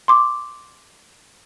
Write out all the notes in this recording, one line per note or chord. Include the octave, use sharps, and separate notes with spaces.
C6 D6